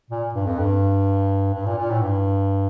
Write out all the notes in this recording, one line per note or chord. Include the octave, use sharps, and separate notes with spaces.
A#2
G2
F2
G2
G2
A#2
A#2
A2
G2